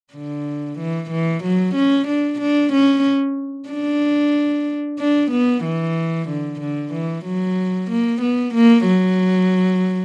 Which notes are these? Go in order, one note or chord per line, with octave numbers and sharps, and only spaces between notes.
D3
E3
E3
F#3
C#4
D4
D4
C#4
D4
D4
B3
E3
D3
D3
E3
F#3
A#3
B3
A#3
F#3